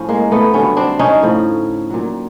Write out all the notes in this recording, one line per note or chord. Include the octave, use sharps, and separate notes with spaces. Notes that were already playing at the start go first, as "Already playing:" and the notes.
Already playing: A2 F3 C#4
G#3 A#3
A3 B3
G2 D3 F#3 B3 C#4
C4 D4
C#4 D#4
A2 F3
A#2 F#3